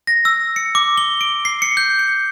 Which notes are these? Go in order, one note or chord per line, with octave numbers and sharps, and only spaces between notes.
A#6
E6
C#7
D6
G7
D7
C7
C#7
G6
C#7